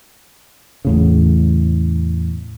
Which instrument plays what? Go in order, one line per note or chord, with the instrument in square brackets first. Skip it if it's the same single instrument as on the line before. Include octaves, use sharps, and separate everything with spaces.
[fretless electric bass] E2 A2 C#3